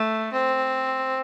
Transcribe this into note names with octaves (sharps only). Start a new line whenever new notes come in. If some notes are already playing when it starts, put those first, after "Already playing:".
Already playing: A3
C4